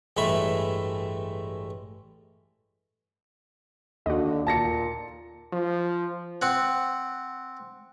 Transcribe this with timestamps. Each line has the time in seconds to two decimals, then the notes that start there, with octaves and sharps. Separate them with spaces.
0.17 A1 G2 G#3 A3 E5 B5
4.06 D#2 D3 F#4 D#5
4.47 A#2 A5 A#6 C#7
5.53 F3
6.42 C4 F#5